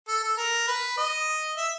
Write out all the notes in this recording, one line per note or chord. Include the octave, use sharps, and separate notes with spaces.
A4
A4
A#4
B4
D#5
E5